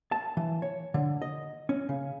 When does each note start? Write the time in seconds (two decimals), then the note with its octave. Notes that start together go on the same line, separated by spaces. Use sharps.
0.12 A5
0.37 E3
0.62 C#5
0.94 D3
1.22 D#5
1.69 C#4
1.89 C#3